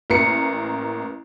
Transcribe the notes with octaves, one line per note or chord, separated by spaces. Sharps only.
A1 A#3 A#5 C7 C#7